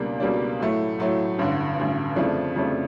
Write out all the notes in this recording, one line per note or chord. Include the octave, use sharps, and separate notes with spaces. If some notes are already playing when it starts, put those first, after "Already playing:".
Already playing: C#2 B2 G3 A#3 D4
C#2 B2 G3 A#3 D4
A2 F#3 A3
A2 F#3 A3
A1 G2 D3
A1 G2 D3
F2 C#3 F3 A3 D4
F2 C#3 F3 A3 D4